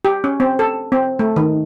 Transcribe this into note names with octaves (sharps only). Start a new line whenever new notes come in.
G4
C#4
C4
A4
C4
A3
D#3